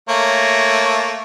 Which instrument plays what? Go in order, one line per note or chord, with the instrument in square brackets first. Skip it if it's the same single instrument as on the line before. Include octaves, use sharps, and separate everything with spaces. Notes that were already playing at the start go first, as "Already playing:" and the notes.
[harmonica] A3 A#3 C#5